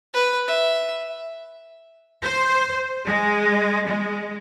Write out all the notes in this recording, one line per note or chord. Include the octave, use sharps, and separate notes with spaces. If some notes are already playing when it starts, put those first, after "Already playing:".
B4
E5
C5
G#3
G#3